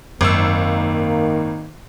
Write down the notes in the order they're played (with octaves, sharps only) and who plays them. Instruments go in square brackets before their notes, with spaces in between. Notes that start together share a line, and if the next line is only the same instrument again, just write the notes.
[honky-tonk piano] G#1 E6 [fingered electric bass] F#2 [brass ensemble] D#3 A#3